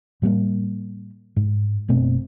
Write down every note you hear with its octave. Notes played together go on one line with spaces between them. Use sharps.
A2 G3 A3 A#3
G#2
F#1 B2 A3 C4